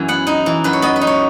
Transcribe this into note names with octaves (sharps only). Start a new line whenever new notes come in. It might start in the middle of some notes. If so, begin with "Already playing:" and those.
Already playing: F#2 E3 G#5
B3 F#5
D#4
E3
F#2 B4
C#5
B3 D#5
B4
D#4
C#5